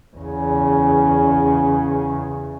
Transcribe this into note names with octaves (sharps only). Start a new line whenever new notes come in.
E2 C#3